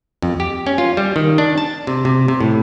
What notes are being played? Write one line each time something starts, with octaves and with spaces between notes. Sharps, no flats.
F2
G4
C#4
F4
G3
D#3
D4
A5
C3
C3
C3
A2